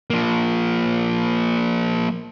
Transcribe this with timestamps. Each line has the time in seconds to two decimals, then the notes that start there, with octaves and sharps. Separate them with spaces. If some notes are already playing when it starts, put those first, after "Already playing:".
0.10 F3 A#3